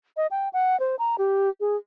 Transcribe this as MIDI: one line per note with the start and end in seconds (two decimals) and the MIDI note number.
0.17 0.27 75
0.31 0.49 79
0.53 0.79 78
0.80 0.96 72
0.99 1.16 82
1.18 1.49 67
1.60 1.76 68